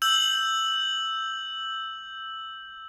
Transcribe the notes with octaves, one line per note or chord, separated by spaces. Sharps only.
E6 G6 F#7